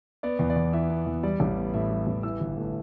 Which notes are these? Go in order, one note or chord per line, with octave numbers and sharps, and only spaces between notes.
B3 D5
E2
D5
E2
E3 E5
B3
E2
G3 D5
A1
B3
A2 E5
G3
A1
E3 E6
G1
A3